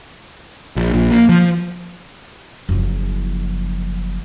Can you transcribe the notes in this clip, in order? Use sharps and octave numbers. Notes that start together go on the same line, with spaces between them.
A#1
A#1
A#3
F3
F#1 F3